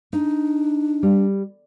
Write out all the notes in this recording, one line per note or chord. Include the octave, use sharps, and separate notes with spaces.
D4 D#4
G3